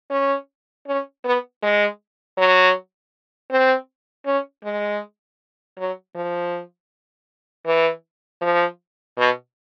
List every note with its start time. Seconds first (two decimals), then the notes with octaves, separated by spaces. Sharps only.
0.10 C#4
0.87 C#4
1.24 B3
1.63 G#3
2.37 F#3
3.51 C4
4.26 C#4
4.64 G#3
5.78 F#3
6.15 F3
7.66 E3
8.41 F3
9.17 B2